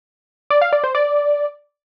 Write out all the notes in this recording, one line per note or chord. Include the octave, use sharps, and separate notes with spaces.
D5
F5
D5
C5
D5